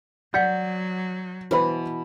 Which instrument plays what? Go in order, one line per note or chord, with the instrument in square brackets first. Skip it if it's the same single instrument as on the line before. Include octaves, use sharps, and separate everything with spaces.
[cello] F#3 [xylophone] D5 F#5 B6 [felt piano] G6
[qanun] B2 E3 [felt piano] B4 C5 B5